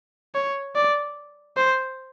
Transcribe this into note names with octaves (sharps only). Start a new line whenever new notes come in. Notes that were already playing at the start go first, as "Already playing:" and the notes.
C#5
D5
C5